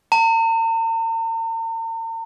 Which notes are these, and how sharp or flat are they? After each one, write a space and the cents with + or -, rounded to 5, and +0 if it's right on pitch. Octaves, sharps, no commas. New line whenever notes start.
A#5 -45